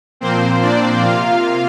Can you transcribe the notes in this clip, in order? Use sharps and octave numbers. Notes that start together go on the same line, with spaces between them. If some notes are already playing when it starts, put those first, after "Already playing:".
A#2 F3 A#3 C4 C5
D4 D5
C3 A#3 F4 F5